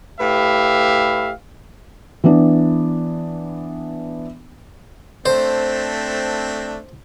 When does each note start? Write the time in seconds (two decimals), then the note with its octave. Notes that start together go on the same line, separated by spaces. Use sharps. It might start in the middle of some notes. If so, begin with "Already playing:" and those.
0.20 A2 G4 B4 E5 F5
2.24 E3 B3 D4
5.26 A3 C4 D4 C5